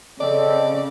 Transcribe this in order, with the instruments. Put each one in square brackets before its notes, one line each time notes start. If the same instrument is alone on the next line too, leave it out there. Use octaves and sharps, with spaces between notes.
[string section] C#3 [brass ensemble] C4 A4 [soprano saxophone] D5 [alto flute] D#5